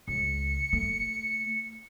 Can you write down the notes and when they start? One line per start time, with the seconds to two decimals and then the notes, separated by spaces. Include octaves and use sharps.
0.08 C#2 C#7
0.73 A3